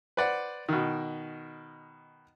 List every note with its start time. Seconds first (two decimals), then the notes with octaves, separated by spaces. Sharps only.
0.17 B4 C5 D5 F#5
0.69 B2 D#3